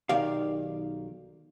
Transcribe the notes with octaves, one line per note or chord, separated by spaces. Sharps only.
B1 D#3 G4 D5 F5